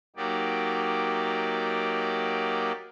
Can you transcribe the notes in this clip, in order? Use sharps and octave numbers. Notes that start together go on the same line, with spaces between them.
F#3 A#3 D#4 G4 D5